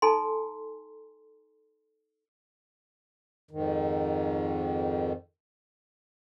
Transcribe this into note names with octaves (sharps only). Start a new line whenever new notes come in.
D#4 A4 G#5 A#5 C6
F2 G#2 D#3